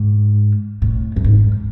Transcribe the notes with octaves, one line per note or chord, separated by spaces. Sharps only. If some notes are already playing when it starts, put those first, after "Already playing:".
Already playing: G#2
A2
F#2
G#2